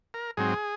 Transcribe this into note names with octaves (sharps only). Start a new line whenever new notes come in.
A#4
G#2 F#3 C4 G#4